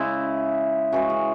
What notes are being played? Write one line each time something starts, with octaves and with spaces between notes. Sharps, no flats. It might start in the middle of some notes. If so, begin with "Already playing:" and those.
Already playing: C#3 G#3 E4
C#3 E3 G#3 F#4
G#4